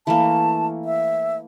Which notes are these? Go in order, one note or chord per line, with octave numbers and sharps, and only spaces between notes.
E3 A3 A#3 A5
E5